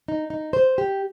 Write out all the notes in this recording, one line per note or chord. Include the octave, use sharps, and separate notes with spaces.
D#4
D#4
C5
G4